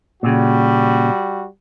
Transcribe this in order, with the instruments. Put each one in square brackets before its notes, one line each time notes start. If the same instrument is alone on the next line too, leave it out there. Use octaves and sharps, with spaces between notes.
[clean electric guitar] A#2 C#3 [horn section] G3 F#4